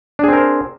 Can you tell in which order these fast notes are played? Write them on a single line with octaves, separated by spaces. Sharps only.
D4 G#4 C4 A#4 C5